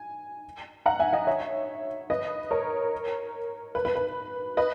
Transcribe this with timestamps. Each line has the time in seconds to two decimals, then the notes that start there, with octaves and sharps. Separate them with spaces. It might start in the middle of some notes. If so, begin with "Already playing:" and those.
Already playing: G#5
0.86 F#5 A#5
0.99 E5 G#5
1.13 D#5 F#5
1.27 C#5 E5
2.10 B4 D#5
2.51 A#4 C#5
3.75 B4
3.85 B4
3.95 B4
4.57 B4 D#5